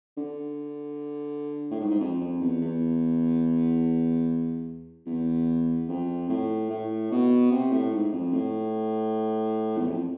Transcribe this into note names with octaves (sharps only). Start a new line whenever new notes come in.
D3
A2
G#2
G#2
F2
F2
E2
E2
E2
F2
A2
A2
B2
C3
A2
G#2
F2
A2
E2
F2